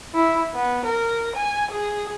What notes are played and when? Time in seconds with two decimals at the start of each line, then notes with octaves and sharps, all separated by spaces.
0.14 E4
0.54 B3
0.85 A#4
1.36 G#5
1.71 G#4